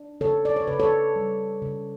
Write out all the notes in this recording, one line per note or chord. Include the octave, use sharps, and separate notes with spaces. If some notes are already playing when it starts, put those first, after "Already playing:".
Already playing: D4
C#3 A4 C#5
D5
C#5
C#3 B4
A4 C#5
G3
C#3